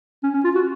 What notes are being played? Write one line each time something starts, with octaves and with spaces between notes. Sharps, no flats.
C#4
C#4
F4
F#4